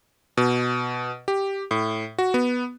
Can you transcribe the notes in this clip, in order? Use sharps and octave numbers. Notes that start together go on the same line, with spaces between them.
B2
G4
A2
F#4
B3